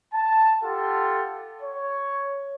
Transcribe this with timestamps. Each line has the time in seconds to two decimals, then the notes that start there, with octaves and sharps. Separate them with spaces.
0.13 A5
0.62 F4 G4 A4 F#5
1.62 C#5